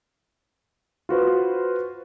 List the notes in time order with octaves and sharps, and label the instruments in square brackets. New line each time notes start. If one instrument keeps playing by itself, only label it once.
[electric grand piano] F4 F#4 B4 C5